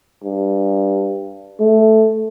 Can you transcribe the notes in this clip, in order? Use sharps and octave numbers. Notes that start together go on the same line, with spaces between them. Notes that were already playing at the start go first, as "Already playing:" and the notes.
G2
A3